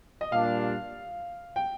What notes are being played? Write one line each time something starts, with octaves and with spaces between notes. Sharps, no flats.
D#5
A#2 G3 D4 F5
G5